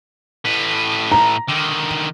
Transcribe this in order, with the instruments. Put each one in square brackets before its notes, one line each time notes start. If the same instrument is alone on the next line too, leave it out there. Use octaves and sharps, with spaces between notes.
[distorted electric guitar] A2 B4
[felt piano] A#5
[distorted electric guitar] D3 D#3